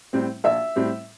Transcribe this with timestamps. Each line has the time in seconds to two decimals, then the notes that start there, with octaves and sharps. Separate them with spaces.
0.13 A2 G3 C4
0.44 A#1 E5 E6
0.76 A2 G3 C4